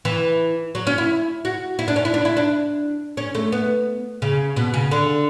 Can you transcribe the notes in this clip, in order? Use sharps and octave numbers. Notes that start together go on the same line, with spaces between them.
E3
F#3
C#4
E4
F#4
E4
D4
C#4
E4
D4
E4
D4
C#4
A3
B3
C#3
B2
C#3
D3